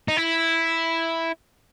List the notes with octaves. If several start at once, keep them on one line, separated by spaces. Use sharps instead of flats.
D#4
E4